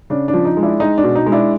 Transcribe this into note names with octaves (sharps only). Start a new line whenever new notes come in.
C#3 D4
D4
F3
D#4
G#3
D4 E4
G#3 D#4
D4
B2
D#4
G#3
D4 E4